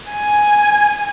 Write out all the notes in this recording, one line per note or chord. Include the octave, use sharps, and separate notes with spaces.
G#5